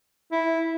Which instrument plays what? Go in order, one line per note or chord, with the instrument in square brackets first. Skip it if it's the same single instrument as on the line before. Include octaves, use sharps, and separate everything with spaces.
[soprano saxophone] E4